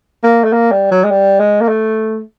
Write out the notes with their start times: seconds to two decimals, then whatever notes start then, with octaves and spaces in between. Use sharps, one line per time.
0.24 A#3
0.44 A3
0.53 A#3
0.72 G3
0.91 F#3
1.04 G#3
1.11 G3
1.39 G#3
1.61 A#3
1.69 A3